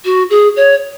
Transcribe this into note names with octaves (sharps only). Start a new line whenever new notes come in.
F#4
G#4
C#5